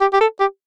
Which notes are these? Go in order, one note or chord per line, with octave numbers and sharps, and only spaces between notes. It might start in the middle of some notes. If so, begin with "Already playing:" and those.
G4
G4
A4
G4